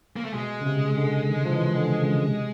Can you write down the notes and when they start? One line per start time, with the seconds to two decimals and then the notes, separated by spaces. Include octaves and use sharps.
0.16 A#3
0.25 A3
0.34 B2 G#3
0.61 C#3
0.66 C3
0.97 D3
1.28 D#3
1.45 F3
1.52 E3
1.75 D3
2.00 C#3
2.23 C3